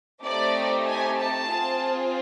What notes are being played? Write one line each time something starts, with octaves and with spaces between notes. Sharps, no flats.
A3 C4 D#4 G4 D5
G#5
A5
C4 F4 G#4